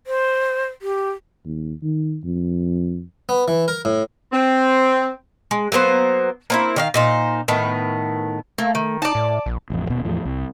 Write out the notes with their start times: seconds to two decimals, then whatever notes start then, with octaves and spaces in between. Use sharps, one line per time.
0.07 C5
0.82 G4
1.46 D#2
1.83 D#3
2.24 F2
3.29 B3
3.48 E3
3.68 A#4
3.85 A2
4.32 C4
5.51 G#3
5.72 F#3 A#3 B3 C5
6.50 A#3 C4 E4
6.76 D#3 D5 F5
6.94 A#2 D#4 C5
7.48 A2 D#3 B3
8.58 A3 A#3
8.75 D#3
9.02 D#4 D5 A5
9.15 A2
9.46 A#1
9.70 A1 F2
9.87 D#1 B2
10.05 E2 A2 F3
10.25 C2